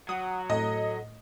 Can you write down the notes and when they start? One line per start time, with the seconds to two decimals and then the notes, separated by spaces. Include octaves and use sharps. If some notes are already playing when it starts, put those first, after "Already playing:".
0.09 F#3 F#5 D#6
0.50 A2 A4 D#5